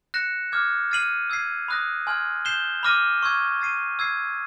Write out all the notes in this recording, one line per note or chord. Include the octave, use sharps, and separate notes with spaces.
F#6 A#6 C#7 E7
D6 F6 G#6
F6 A6 C7 D#7 F#7
E6 G#6 C7
B5 D#6 F#6 A#6
G#5 C6 F6 G#6
G6 C7 E7 G7
B5 D6 F6 A#6 D#7
C#6 E6 G#6
E6 A6 C7 D#7
E6 G#6 C7